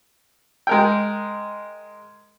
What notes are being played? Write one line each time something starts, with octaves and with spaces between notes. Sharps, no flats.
G#3 A#4 G5